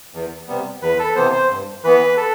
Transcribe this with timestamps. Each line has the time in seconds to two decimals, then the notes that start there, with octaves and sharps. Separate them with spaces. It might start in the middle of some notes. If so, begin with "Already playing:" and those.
0.14 E2
0.48 C3 G3 B3
0.82 E2 B4
0.99 A4
1.15 C3 E3 B3 C5
1.32 C5
1.50 G2
1.83 E3 B3 B4
2.17 A4